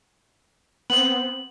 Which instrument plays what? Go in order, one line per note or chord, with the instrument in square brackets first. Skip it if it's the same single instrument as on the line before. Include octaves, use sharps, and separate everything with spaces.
[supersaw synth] B3 C4 [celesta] F#7